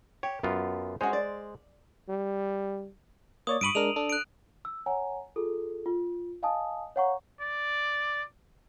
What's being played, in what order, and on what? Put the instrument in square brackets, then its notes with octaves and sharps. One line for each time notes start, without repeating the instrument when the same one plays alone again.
[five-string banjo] G4 [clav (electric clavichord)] C#5
[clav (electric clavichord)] F#2 B3 F4
[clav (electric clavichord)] G#3 C5 [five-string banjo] C#4 F#4
[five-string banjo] D5
[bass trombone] G3
[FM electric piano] A#3 C#5 D5 [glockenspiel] D#6
[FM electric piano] G2 B5 C#6 [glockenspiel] D7 D#7 F#7
[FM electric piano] G#3 D4 A#4 [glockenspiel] F7
[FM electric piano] D4 A4
[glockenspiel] F#6 D7
[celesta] E6
C#5 F#5 G#5 A#5
F4 G#4 A4
F4
D#5 F5 G#5 A5 D#6
C#5 F5 F#5 A#5 C#6
[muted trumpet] D5